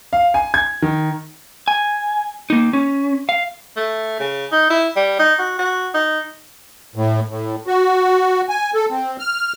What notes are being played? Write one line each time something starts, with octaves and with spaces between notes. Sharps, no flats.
F5
G#5
G#6
D#3
G#5
A#3 D#4
C#4
F5
A3
C#3
D#4
E4
G3
D#4
F#4
F#4
D#4
A2
A2
F#4
G#5
A4
C4
F6